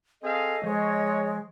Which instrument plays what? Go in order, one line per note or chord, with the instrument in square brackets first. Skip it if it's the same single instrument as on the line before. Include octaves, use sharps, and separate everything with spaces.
[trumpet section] C4 G#4 F5 [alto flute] A4 [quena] D#5
[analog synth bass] F3 [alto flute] G#3 [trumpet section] C#5